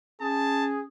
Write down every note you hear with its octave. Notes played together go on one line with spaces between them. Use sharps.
C#4 G#4 A5